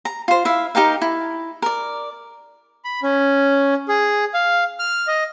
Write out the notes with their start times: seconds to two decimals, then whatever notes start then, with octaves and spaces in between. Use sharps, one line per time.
0.05 A#5
0.28 F4 C5
0.45 E4 E5 F5
0.75 D#4 G4 A#4 F5
1.02 E4
1.62 A#4 D5
2.85 B5
3.03 C#4
3.88 G#4
4.34 F5
4.79 F6
5.08 D#5